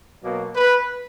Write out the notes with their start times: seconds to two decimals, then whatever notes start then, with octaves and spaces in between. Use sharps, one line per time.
0.22 B2 F#3 A#3
0.55 B4